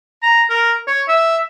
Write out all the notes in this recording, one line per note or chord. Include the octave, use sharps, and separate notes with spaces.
A#5
A#4
C#5
E5